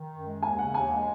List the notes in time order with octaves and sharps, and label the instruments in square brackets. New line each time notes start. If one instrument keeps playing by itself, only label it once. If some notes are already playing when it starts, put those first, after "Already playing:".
Already playing: [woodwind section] D#3
F#2
G#3
[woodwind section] D#2 [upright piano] G#5
[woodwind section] C#3 [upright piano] F#5
[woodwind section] D#2 [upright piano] G#5
[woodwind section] G#3